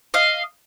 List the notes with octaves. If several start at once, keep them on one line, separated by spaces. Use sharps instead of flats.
D#5 F5